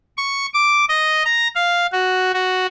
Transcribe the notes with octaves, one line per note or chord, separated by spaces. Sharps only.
C#6
D6
D#5
A#5
F5
F#4
F#4